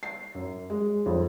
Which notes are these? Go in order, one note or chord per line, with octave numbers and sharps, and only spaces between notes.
C7
F#2
G#3
F2